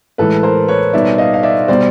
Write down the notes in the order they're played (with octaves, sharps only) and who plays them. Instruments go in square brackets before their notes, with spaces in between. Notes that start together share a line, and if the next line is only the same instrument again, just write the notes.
[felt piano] A2 E3 G#3 [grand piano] A4 B4
[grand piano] A#4 C5
B4 C#5
[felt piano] B2 G3 B3 D#4 [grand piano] D5 E5
[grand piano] D#5 F5
F5
D5 E5
[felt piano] B2 G3 [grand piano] C5 D5